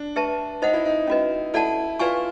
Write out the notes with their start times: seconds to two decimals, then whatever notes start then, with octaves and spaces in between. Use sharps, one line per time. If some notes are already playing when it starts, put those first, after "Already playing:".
Already playing: D4
0.16 G4 B4 E5 A5
0.62 D#4 C5 D#5 F#5
0.73 E4
0.85 D#4
1.07 C#4 F#4 B4 D#5
1.54 E4 A4 D5 F#5 A5
1.99 F4 B4 D5 F5 G#5 C#6